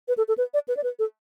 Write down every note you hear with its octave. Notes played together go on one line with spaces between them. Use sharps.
B4
A4
A4
B4
D5
B4
D5
B4
A4